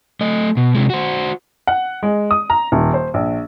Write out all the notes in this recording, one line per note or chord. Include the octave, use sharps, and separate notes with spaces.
A3 D#5
B2
C3 G#3
F#4 C5
F#5
G#3
D#6
A#5
D#1
C5
A#1